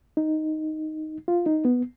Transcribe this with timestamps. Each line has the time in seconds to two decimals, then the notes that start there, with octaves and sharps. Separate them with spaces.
0.17 D#4
1.28 F4
1.46 D#4
1.65 B3